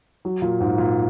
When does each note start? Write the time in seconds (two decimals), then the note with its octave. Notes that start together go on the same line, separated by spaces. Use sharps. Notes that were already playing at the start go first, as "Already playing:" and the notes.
0.25 F#3
0.42 A#2
0.60 G#2
0.78 A#2